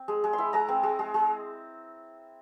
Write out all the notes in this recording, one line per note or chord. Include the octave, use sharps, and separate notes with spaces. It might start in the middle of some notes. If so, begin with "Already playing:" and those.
Already playing: C4
G#3
G#3
C6
E4 B5
G#3 A#5
C4
G#3
G#3
G#3